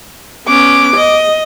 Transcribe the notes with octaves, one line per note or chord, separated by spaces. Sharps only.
B3 C#4 D6
D#5